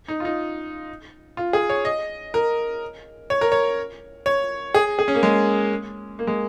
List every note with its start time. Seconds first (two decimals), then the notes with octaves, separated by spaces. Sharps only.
0.08 D#4
0.20 F4
0.25 D#4
1.37 F4
1.53 G#4
1.70 C#5
1.85 D#5
2.34 A#4
3.30 C#5
3.41 A#4
3.52 C#5
4.26 C#5
4.74 G#4
4.99 G#4
5.08 C#4
5.15 A#3
5.23 G#3
6.19 A#3
6.27 G#3